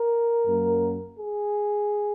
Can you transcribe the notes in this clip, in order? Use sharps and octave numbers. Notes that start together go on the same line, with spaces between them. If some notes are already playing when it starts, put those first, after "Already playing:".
Already playing: A#4
F#2 F#3 A#3
G#4